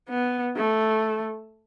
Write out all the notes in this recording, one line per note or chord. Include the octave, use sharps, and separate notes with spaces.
B3
A3